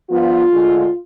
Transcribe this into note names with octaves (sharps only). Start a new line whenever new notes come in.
G2 F3 B3 F4
D2 D3 G#3